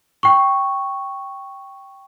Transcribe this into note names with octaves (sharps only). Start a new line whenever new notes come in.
G5 C#6